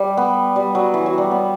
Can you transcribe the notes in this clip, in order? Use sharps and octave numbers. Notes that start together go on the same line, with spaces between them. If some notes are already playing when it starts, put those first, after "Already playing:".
Already playing: G3
B3
G3
F#3
E3
F#3
G3
B3